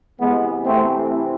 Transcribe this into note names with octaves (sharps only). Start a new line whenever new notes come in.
C3 E3 G#3 B3
A3 C4